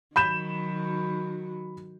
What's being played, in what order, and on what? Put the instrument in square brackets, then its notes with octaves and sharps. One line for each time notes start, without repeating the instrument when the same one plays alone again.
[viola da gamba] D#3 F#3 F#4 [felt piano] B5 G6 E7